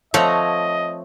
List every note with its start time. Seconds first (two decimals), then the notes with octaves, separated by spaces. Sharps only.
0.14 F3 A3 C4 C#5 D#5 F#5 A#5